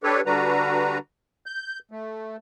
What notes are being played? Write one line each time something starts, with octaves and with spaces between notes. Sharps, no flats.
D4 G4 A4 B4 C#5
D3 G3 D4 F#4 B4 A#5
G6
A3